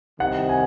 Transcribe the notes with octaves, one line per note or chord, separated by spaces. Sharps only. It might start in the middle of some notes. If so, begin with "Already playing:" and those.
C2 C3 D#3 F#5
G#5